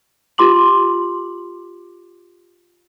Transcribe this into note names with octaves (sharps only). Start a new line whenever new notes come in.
F4 G4 C6 D6 F#7